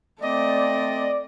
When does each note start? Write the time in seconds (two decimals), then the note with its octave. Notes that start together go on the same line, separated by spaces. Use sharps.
0.22 A3 C4 D5 D#5